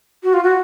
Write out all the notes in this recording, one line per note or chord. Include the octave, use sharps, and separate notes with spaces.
F#4
F4
F#4